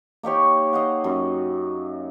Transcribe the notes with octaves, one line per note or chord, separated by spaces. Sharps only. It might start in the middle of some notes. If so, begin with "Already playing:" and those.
A#3 D#4 G4 C#5
D#5 F5 F#5
F#2